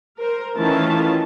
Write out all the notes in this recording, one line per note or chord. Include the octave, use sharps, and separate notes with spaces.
A#4 C5
D#3 E3 A3 C#4 F4 A5